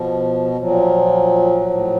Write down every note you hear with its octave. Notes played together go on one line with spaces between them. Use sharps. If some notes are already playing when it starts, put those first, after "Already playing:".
Already playing: B2 F3
A#2 F3 F#3
F3
A2